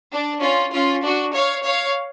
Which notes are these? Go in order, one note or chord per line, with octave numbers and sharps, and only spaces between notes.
D4
C#4 F4
C#4 F4
D4 F#4
C#5 F5
C#5 F5